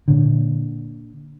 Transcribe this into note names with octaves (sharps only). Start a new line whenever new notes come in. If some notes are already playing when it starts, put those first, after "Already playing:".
A#2 D3